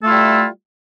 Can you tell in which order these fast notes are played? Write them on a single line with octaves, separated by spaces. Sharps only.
A3 A4 F4 E4 G3